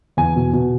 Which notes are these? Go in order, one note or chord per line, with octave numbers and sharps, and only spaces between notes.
E2 G#5
B2
B2